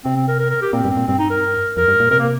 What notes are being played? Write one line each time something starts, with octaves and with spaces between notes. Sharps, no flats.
C3 C4
C4
A#4
A#4
A#4
G4
A#2 C4
G2
C4
A#2
G2 C4
D#4
A#4
F2 A#4
G2
A#2
C3 A#4
A#3